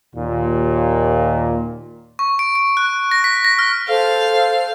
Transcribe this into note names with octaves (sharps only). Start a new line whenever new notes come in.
D#2 A#2
C#6
D7
D7
F#6
A#6
B6
A#6
F6
A4 C5 F5